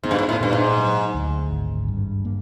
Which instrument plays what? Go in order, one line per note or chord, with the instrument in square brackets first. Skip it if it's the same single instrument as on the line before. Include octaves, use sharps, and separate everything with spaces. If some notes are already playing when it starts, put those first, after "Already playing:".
[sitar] G#2 [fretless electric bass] B3
[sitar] G2
G#2
A2
[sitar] G2 [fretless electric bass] A#2
[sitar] G#2
[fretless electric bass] F#3
D2
G#1
G2
A#3